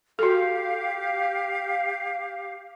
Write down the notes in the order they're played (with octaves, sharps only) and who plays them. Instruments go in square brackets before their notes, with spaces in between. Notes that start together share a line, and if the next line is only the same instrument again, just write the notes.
[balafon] F#4 A4 [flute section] G4 F5